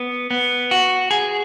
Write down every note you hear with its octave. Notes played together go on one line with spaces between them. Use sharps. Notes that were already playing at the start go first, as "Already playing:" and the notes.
Already playing: B3
B3
F#4
G#4